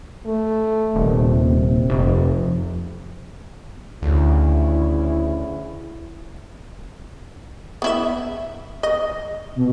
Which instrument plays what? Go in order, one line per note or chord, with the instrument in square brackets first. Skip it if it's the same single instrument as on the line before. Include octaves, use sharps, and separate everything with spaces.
[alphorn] A3
[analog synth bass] D#1 [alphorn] C3
[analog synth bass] F1
[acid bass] D2 [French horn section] C#3 E4
[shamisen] B3 E4 E5
D#5
[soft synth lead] B2